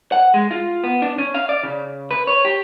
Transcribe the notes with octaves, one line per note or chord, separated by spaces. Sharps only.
F#5
G#3
F4
B3
D4
C#4
F5
D5
C#3
B4
C#5
G4